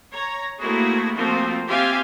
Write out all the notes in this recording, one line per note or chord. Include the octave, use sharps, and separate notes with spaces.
C#5 A#5
A3 A#3 C4 E4 F#4 G#4
F3 A3 A#3 C4 F4 F#4
C4 F4 G4 E5 F5 G#5